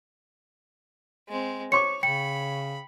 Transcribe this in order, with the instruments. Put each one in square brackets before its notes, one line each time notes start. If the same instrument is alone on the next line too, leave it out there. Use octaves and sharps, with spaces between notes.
[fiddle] G#3 C4
[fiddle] C5 [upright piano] C#5 C#6 [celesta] D6 C#7
[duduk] C#3 [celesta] G5 C#7 [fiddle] B5